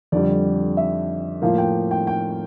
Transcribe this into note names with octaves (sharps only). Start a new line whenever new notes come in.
F2 D3 G3 D5
E5
A2 F3 A#3 F5
G5
G5
G5